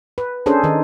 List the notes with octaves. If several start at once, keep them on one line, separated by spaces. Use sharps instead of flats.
B4
C#4 D4 G#4 A4 C5
D#3 D#4